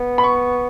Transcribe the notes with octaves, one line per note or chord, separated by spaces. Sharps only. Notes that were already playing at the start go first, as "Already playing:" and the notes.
Already playing: B3
B5
C#6